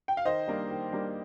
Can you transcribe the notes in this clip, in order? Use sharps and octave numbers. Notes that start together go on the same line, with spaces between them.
G5
F5
D#3 C5 D#5
G3 A#3 D4
D#3
G3 A#3 D4